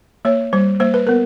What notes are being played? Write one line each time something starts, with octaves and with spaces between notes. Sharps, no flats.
A#3 C#5
G3 C5
A#3 C5
B4
B3 A#4